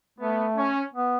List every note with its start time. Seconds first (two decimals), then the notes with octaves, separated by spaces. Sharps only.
0.19 A3 B3
0.56 C#4
0.94 B3